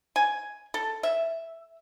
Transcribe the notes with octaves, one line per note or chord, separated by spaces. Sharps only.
G#5
A4
E5